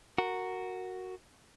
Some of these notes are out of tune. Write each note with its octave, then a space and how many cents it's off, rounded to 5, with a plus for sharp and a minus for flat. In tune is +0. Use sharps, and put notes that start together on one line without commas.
F#4 +0 A#4 -10